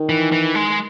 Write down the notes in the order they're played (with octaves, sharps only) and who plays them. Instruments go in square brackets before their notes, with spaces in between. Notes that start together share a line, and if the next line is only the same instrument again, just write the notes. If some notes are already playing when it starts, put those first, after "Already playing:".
Already playing: [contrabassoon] D#3
[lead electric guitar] E3
E3
G#3